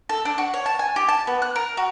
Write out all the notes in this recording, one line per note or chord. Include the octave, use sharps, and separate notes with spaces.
A4
D4
F#4
C#5
A5
G#5
G4
A5
B3
F#6
A#4
F#4